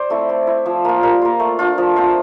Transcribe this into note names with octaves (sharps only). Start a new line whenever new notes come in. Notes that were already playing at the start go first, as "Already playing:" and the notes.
Already playing: C5 D5
A3 C4 E4
A3
E4
F3
A#3 F4
G3 A#4
A#3 F4
A3
D4 F4
F3
C4 F4